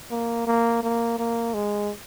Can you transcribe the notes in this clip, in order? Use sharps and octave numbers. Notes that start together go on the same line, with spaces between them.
A#3
A#3
A#3
A#3
G#3